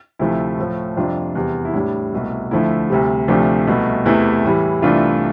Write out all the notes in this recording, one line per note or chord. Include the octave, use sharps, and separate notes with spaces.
D2 C3 F3 A3 E4
A2 F3 A3
F2 C3 G3 D4 F4
E2 C3 G3
E4
A2 G3 D4
C2 B2 A3
D2 D3 F3 A3 E4
D2 C3 G3
D2 C3 F3 A3 D4
C2 B2 A3
E2 C3 E3 A3 E4
A2 E3 G3
C2 C3 E3 A3 D4 F4